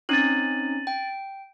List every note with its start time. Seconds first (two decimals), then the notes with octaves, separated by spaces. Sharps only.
0.09 C4 C#4 D#4 A6 D#7 F#7
0.87 G5